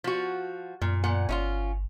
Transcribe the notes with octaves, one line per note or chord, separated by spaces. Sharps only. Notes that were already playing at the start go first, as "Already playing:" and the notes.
F3 F#4
F#2 A#2
A#2 F#5
G1 C#4 D#4 F4